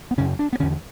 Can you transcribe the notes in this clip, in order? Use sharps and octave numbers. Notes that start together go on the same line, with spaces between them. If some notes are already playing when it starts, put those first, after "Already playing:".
B3
F#2 C#3 C#4
D4
B3
E2 D3 C#4